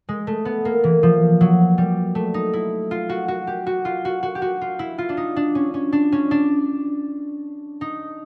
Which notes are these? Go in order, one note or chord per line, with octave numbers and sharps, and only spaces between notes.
G#3
A3
B3
A#3
E3
F3
F#3
G3
A3
D#4
E4
F4
F#4
F#4
G4
F#4
F4
F#4
F#4
G4
F#4
F4
E4
F4
D4
D#4
D4
C#4
C#4
D4
C#4
D4
D#4